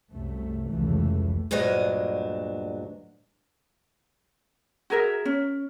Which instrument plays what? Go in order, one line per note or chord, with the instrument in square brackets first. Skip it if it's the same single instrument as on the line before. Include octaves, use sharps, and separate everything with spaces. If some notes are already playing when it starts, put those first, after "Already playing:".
[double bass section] C2 F#2 A3
F1 C#2 E3 A3
[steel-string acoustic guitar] D2 G2 A#2 F#3 D4 D#5
[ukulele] F#4 G#4 A#4 E5
C#4